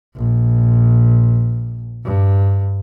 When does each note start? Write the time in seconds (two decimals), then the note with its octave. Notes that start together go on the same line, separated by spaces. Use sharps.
0.16 A#1
2.04 G2